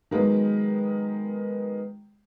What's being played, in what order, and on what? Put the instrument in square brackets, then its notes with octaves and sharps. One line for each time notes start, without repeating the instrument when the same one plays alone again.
[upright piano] D#3 F#3 G#3 B3